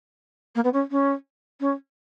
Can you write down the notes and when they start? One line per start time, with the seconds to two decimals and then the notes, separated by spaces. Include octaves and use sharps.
0.55 A#3
0.64 B3
0.73 C#4
0.91 C#4
1.60 C#4